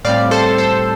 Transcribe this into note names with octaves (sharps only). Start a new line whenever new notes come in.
A2 G3 C4 D5 F5
A4 C5
A4 C5